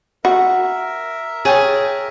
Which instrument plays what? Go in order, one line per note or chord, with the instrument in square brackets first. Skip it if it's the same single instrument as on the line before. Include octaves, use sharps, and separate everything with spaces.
[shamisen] F#4 [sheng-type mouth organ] A#4 E5
[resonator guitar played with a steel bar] G#4 [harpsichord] C#5 G5 A5